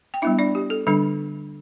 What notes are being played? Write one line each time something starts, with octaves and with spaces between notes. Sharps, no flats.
G5
G3 B3 D4 E4 E5
D4 D5
G4
A4
D3 G3 D4 A4